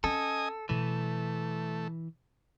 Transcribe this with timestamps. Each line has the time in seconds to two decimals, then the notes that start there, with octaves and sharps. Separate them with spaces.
0.04 C#4 A4 D#5 G#5 D#6
0.69 B2 E3 A3